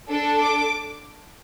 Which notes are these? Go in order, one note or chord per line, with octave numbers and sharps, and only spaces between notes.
D4 A4
D6